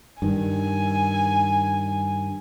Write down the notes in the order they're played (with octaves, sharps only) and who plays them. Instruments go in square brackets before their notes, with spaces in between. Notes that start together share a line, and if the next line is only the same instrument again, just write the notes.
[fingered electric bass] G2 D#3 [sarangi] G#5